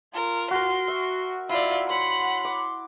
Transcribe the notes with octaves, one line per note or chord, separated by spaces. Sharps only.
F4 A#4
F#4 A#4 C6
F#4 E5
E4 F4 D5 E5
C#5 F#5 B5 C6
D6